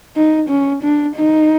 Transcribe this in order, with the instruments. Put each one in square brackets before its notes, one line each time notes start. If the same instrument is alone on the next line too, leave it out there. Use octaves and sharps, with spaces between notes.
[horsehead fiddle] D#4
C#4
D4
D#4